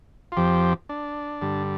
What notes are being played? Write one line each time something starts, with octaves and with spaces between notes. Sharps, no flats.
F4
F2 F3 G4
D4
G2 D3 G3